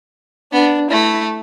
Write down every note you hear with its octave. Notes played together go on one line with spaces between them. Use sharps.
B3 D4
A3 E4